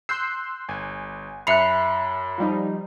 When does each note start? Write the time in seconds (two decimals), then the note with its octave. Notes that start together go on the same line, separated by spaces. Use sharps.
0.09 C6 E6 F#6 G6 C7
0.69 G1 G#5
1.47 F#2 E5 B5 F#6 C7 C#7 F7
2.38 F3 G3 D#4